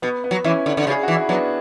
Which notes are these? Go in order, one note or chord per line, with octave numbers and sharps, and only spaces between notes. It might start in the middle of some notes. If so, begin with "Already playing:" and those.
B2 B3
B3
F#3
E3 C#4 E4
D3
D3
C#3
G#4
E3 F#4
E4
F#3 B3 D4